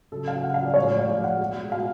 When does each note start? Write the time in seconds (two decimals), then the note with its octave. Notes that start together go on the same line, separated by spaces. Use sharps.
0.12 C#3 F#3 A4
0.28 F5
0.44 C#3 F#3 F#5
0.54 F5
0.66 D5
0.74 A2 F3 G#3 C#5
0.82 D5
0.99 F5
1.08 A2 F3 G#3 D5
1.24 F#5
1.40 B2 G#3
1.71 B2 G#3 F5